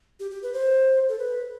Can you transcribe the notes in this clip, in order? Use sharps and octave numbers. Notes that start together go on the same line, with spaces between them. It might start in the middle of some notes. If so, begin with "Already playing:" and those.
G4
G4
B4
C5
A4
B4